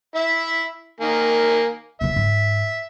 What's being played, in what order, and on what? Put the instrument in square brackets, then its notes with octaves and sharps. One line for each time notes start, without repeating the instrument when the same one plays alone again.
[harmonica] E4 E5
D#3 A#3 G#5
[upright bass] C3 E3 [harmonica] E5
[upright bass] G#2